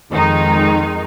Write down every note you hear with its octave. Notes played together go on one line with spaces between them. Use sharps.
F2 D#3 G#3 D#4